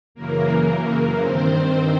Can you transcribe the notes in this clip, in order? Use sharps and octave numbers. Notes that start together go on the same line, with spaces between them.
F#2 C#3 E3 A#3 A#4
G2 D#3 C4 C5